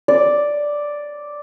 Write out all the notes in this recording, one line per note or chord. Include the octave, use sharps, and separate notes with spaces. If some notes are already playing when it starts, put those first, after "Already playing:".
D5